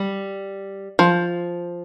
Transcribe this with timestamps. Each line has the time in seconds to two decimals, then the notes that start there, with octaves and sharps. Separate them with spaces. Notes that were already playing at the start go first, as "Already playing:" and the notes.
Already playing: G3
0.99 F3